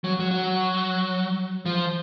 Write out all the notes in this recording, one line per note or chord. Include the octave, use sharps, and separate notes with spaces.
F#3
F#3
F#3
F3